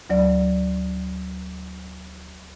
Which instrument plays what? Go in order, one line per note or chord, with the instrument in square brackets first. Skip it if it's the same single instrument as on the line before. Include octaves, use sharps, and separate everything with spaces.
[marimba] D2 F#3 D5